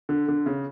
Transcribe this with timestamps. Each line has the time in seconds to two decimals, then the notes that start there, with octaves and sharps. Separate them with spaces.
0.09 D3
0.28 D3
0.46 C#3